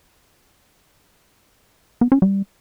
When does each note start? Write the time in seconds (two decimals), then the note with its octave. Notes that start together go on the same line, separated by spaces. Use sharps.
2.01 B3
2.12 C#4
2.22 G3